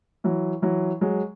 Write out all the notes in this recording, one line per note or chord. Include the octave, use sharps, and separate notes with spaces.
E3 F#3
E3 F#3
F#3 G#3